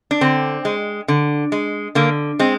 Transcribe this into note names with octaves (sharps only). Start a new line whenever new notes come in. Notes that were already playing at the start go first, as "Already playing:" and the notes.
D4
D3 C4
G#3
D3
G#3
D3 A#3
G#3 C4